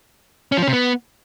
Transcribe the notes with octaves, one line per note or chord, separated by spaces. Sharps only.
C#4
F3
C#4
C3
B3